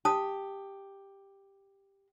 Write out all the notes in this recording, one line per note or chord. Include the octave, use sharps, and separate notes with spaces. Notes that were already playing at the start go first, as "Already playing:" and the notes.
G4 A5 D#6